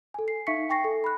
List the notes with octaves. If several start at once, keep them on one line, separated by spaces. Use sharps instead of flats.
A4 G#5
C7
D#4 E5 F5 C#6 B6 C#7
G5 G#5 C#6 A#6 C7
A4
B5 F#6